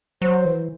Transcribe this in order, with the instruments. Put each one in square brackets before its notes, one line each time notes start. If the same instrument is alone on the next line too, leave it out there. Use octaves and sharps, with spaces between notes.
[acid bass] F#3 [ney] C5
[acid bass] E3